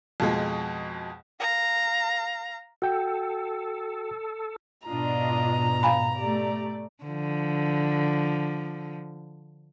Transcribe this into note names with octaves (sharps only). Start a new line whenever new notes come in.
F2 B2 G#3
F5 A#5
F#4 A4 G5
G#2 B2 D4 F4 D#5 A#5
F5 G#5 B5
A3 G4 D5
D3 F3